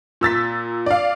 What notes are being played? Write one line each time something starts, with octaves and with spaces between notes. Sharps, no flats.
A#2 E6 A6 B6
D5 F5